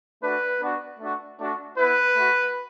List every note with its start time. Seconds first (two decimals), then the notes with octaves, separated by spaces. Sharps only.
0.23 A3 D4 F#4 B4
0.60 B3 D4 F#4
1.00 A3 D4 F#4
1.39 A3 D4 F#4
1.77 B3 E4 B4
2.16 A3 F#4